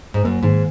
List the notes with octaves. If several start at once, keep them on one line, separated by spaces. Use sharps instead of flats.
G#2
F#2 A#3
G#2 D#3